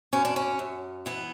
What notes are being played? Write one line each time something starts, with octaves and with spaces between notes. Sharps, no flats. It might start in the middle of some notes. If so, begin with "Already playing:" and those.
F#2 C#4
D4
C#4
F#2
E3 B3